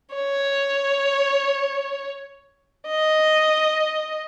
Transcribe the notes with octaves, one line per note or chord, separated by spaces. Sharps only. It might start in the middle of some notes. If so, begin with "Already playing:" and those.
C#5
D#5